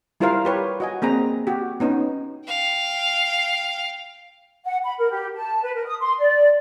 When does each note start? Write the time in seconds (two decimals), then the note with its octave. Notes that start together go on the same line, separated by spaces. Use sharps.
0.20 G3 E4 F4 A#4 C5 F5
0.45 G4 B4 C#5
0.80 F#4 D#5 G#5
1.02 A#3 C4 G#4 A#5
1.47 F#4 G4
1.80 B3 C#4 D#4
2.47 F5 G5
4.65 F#5
4.84 B5
4.98 A#4
5.10 G4
5.35 A5
5.62 B4
5.74 A#4
5.86 D#6
6.00 C6
6.18 D5